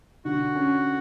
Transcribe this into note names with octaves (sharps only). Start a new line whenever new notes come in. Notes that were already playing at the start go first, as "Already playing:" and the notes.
D3 F#4
C#4